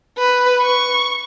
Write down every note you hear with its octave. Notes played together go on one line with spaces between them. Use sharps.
B4
C#6